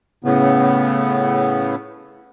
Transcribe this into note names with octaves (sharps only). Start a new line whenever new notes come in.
A2 C#3 B3